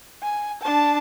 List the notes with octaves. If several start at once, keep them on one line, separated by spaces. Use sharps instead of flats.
G#5
D4 A5